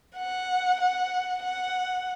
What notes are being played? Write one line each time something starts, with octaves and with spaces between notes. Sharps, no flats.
F#5
F#5
F#5